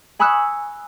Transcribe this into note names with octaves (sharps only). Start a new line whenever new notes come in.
G#5 B5 C#6 D#6 E6 F#6